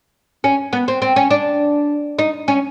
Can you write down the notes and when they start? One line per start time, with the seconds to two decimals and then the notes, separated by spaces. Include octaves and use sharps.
0.44 C#4
0.73 B3
0.88 C4
1.02 C4
1.16 C#4
1.31 D4
2.19 D#4
2.48 C#4